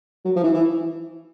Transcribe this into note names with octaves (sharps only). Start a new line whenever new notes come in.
F#3
F3
E3
E3